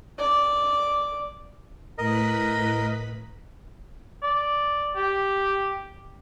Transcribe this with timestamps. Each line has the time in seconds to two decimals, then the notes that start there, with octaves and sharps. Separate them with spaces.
0.19 D5
1.98 A2 A#4 B4 D#5 B5
4.23 D5
4.96 G4